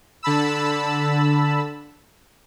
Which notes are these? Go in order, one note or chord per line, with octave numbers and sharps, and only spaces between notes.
D3 A5 B5 E6